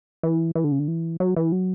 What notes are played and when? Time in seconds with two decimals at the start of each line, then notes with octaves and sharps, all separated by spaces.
0.23 E3
0.55 E3
0.64 D3
0.71 C#3
0.79 D3
0.88 E3
1.20 F#3
1.36 E3
1.52 F#3